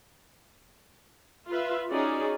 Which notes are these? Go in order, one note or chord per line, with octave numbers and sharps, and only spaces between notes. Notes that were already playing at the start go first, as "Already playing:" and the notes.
F4 B4 E5
C#4 D#4 F#4 G#4 D5